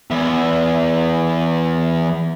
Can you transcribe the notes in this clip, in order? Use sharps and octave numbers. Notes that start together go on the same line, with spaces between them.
E2 E5